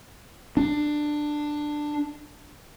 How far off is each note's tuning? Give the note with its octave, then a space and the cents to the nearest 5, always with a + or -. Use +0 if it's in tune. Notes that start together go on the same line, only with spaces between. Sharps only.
D4 +15